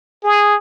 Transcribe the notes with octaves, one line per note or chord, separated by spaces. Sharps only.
G#4